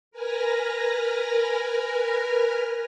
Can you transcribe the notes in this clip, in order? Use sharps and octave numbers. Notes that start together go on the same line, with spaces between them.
A#4 B4 G#5 F6 A#6